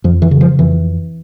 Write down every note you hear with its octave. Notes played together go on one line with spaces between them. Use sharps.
F2 F3
E3
C#3
F3
F2 E3